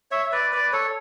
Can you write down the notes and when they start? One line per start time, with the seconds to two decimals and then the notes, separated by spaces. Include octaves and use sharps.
0.11 C#5 E5
0.25 E5
0.32 B4 D5
0.52 B4 D5
0.72 A4 C#5